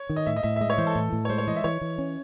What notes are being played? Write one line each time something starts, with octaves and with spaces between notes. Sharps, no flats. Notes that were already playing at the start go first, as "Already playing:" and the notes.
Already playing: C#5
D#3
D#5
A2 E5
D#5
A2 E5
E5
G#3 D#5
C#5
E3 C5
A4
A2
A2
C#5
G#3 C5
C#5
E3 D#5
E5
E3 C#5
E3
C#4